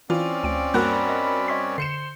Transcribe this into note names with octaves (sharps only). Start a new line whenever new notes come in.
E3 C4 C#4 E4 F4 D5
D2 G5 D7
G2 A#3 F#4 A#4 B5 F#6
D#5
C#5 D#5 C6 B6
D3 C5 C7 C#7 E7